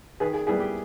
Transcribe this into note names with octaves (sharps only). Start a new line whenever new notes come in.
D#3 G#4 B4
G#4
G3 B3 E4 G#4
G4